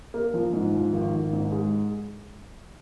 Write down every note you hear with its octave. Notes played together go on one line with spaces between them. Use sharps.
A#3
F3
G#2
F3
G#1
G#1
G#2
G#3